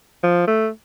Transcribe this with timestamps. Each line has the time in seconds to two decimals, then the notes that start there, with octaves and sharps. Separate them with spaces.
0.23 F3
0.47 A3